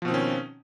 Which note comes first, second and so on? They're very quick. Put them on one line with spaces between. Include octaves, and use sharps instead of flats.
F3 B2 C4 D#3 C#4